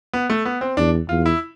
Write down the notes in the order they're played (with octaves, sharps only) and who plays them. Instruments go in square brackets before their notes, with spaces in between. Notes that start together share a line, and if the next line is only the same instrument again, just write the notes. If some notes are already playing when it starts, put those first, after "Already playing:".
[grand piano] B3
A3
B3
C4
[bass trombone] E2 [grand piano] D4
[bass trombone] E2 [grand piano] F4
[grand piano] E4